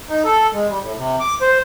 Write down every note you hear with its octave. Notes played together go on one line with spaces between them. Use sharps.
D#4
A4
G#3
G3
A2
C3
D6
C5